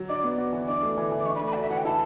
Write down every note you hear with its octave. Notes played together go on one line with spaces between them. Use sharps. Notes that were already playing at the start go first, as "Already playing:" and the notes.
Already playing: F#3
D4 D6
B3
F#4
E3
D4 D6
A3
E3
E3
D6
D4 C#6
B5
A3
B5
F#4 D5
E5
E3 F#5
G5
E4 A5